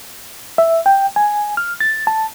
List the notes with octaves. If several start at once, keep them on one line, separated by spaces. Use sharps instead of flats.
E5
G5
G#5
F6
A6
A5